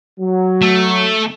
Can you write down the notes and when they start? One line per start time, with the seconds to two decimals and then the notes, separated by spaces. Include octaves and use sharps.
0.19 F#3
0.62 A3